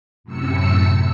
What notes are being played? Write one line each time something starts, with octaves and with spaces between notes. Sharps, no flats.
F#2 A2 C3 E6 C#7